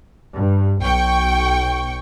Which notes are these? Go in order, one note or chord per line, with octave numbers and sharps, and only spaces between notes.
G2
B1 G5 C#6